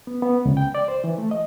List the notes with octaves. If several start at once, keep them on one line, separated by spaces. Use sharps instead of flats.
B3
B3
C#2
G5
D5
C5
E3
A3
D#5